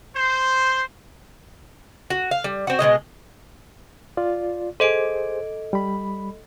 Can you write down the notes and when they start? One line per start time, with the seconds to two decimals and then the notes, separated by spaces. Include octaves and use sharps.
0.15 C5
2.10 F#4
2.31 F5
2.44 G3
2.67 C4 F#4
2.79 B2 F#3 G#3 D#5
4.17 F4 D5
4.80 G#4 A4 C5 D#5 D7
5.73 G3 B5